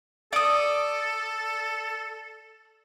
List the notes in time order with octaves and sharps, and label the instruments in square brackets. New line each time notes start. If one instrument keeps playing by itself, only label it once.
[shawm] A4 [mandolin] D5 D#6